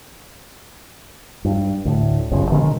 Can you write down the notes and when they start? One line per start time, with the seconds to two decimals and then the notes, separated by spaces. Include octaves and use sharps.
1.45 G2
1.85 D2 A2
2.31 G1 F#2 C#3
2.52 B2 D3 D#3 G#3